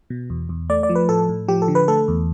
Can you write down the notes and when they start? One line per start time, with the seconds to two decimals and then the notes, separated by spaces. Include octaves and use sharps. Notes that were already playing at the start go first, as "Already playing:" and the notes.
0.10 B2
0.30 E2
0.49 E2
0.69 A3 D5
0.83 D5
0.89 F3
0.95 B4
1.09 A2 A4
1.29 A2
1.48 F3 G4
1.62 A4
1.68 D3
1.75 B4
1.88 A3 A4
2.08 E2